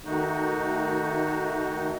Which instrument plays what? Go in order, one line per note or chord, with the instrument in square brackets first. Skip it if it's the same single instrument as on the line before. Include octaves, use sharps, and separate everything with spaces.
[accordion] D#3 A3 D#4 F#4